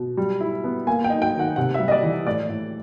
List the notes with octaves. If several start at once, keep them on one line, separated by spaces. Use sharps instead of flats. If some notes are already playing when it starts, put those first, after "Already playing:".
Already playing: B2
G3
E4
B3
A#3 G#5
G5
D#4
G5
D#3
F#5
C3 F#5
E5
G3
D#5
D5
E3
A2 D5
A2